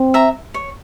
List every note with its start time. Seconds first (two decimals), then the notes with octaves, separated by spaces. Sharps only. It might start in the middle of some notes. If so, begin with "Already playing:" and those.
Already playing: C4
0.14 E5 A#5
0.54 C#5